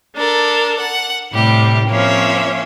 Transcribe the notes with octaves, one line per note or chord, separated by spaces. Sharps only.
D4 A4 A#4
F#5
A2 C3 G3 G4
F3 A#3 C4 C#4 C#5 E5